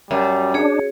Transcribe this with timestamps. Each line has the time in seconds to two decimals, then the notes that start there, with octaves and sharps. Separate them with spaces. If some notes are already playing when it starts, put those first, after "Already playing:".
0.11 F#2 G3
0.54 D4 G#4 C#5